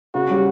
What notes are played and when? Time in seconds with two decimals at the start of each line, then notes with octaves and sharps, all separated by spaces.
0.14 C#3 F#4
0.29 G3 C#4 G4